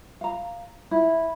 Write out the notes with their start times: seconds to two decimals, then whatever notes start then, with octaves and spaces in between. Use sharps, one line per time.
0.21 F5 A#5
0.91 E4